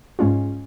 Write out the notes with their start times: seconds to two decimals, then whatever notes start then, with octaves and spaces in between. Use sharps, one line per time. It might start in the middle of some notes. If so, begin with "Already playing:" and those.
0.19 G#2 G#3 C#4 F4